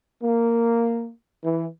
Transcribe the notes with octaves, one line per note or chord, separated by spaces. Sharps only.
A#3
E3